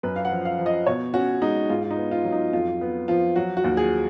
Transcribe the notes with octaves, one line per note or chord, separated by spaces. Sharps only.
F#2 B4
F5
F#5
F3
F5
F3
D#5
B2 C#5
C#4 F#4
G#3 D#4
G#2 F4
F4
D#4
B3
F4
F#3
D#4
F2 F4
B3
F3 F4
F#3 F#4
F#4
D#2
G#4